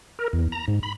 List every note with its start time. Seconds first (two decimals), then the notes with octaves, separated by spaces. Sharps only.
0.19 A#4
0.33 E2
0.52 A#5
0.68 G#2
0.83 B5